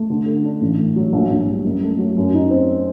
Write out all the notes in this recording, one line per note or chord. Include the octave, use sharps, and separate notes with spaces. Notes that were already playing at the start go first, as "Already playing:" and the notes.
Already playing: A3
D3
A4
D4
A1
A3
F#3
A#1
A#1
G3
F#1
A3
F#3
F#2
D#4
C4